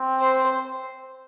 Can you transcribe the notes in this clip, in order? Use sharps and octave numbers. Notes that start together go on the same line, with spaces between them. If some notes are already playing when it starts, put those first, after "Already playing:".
Already playing: C4
C5